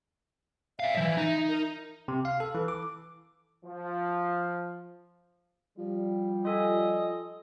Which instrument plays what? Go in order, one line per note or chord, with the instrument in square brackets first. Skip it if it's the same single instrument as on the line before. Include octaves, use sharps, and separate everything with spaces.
[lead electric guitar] D5 F5 [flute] E5
[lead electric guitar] E3 F3
D#4
[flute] A#4
[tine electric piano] C3
F5
A4
E3
D6
[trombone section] F3
[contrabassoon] F3 [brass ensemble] G3
[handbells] F4 A4 G#5 [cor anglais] D#5